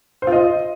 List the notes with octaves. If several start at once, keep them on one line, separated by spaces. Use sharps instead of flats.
C5
F4
D#5